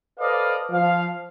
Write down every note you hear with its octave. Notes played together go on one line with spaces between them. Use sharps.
A4 B4 C5 D5 D#5 F5
F3 F5